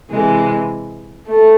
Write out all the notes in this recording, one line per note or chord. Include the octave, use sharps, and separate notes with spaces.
C3 E3 G#3
A3